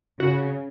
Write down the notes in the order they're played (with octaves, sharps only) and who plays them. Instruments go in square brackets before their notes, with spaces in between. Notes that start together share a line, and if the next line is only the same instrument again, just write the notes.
[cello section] C#3 [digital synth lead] F#4